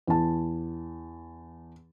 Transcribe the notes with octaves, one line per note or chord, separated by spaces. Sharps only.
E2 A5